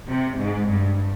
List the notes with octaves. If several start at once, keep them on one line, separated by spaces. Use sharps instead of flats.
C3
G#2
G2